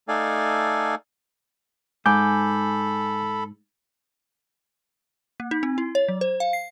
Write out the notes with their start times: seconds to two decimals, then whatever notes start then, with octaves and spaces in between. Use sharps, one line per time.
0.08 A3 D#4 A4 D5 F5 G#5
2.06 G#2 A4 G#5 B5 D6 G6
5.40 A#3
5.51 D#4
5.63 C4
5.78 E4
5.95 C#5
6.08 F#3
6.21 C5
6.40 F5
6.53 C7